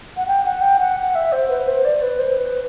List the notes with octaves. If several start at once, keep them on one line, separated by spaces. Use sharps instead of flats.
F#5
G5
F#5
G5
F#5
F#5
E5
C5
B4
C5
D5
B4
C5
B4